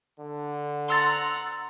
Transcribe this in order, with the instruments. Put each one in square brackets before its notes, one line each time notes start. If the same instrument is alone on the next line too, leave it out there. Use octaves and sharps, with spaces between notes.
[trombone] D3
[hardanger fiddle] F#5 A#5 [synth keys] C6 E6 A6